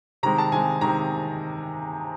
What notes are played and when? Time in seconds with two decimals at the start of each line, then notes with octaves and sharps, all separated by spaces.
0.23 C3 D#3 G#3 A#5
0.38 A5
0.52 C3 D#3 G#3 G#5
0.81 C3 D#3 G#3 A#5